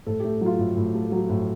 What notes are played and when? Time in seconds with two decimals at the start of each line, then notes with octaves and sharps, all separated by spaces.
0.07 A2 A4
0.20 A3 G4
0.41 F#3 F4
0.59 A2
0.77 A2
0.95 A3
1.12 F#3
1.29 A2